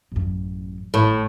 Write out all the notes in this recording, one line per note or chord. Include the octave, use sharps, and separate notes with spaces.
A1 F#2
G#1 A2